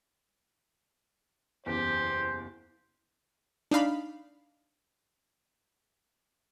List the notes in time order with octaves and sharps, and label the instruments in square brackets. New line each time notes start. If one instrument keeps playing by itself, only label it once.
[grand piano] F#1 E2 [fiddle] G4 [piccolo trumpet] C5
[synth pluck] D4 D#4 F5 B5